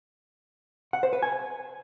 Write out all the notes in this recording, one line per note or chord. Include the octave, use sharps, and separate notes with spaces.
F#5
C5
B4
G#5